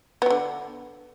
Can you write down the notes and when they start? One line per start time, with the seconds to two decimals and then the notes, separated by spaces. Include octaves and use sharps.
0.22 B3
0.26 F#3
0.30 D3